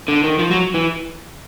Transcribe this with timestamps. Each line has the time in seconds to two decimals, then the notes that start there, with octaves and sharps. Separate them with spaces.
0.08 D3
0.24 D#3
0.39 F3
0.51 F#3
0.74 E3